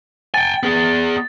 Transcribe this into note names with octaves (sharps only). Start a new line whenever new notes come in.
G5 G#5 A6
B3 G#4